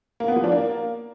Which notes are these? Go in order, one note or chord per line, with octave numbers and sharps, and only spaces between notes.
A#3
B3
F3
D4
A#3